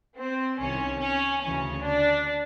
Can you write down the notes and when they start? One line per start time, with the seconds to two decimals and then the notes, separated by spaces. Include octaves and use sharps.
0.17 C4
0.59 C2 C3 D#3 C#4
1.01 C#4
1.42 D2 C#3 E3 C#4
1.85 D4